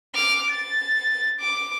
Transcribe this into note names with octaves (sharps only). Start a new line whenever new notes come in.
D6 F6
A6
D6